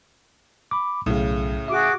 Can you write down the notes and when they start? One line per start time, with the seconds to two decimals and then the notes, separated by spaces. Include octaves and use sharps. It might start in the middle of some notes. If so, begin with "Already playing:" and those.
0.71 B5 D6
1.06 B1 A2 C#3
1.68 F#4 G#4 E5 D6